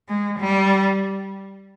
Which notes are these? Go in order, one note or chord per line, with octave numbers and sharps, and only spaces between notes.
G#3
G3